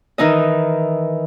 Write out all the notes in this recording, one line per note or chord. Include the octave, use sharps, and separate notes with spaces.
D#3 E3 D#4 D#5